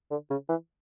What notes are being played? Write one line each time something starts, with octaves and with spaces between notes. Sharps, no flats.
D3
C#3
E3